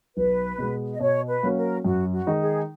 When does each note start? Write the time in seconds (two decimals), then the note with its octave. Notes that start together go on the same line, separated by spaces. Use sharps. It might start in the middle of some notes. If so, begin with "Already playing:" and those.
0.16 B1 B4
0.58 B2 G#3 B3
0.94 D#5
1.00 B2 C#5
1.28 B4
1.43 F#3 A#3 C#4 F#4
1.56 A#4
1.85 F#2 F#4
2.12 F#4
2.27 D#3 G#3 D#4
2.40 G#4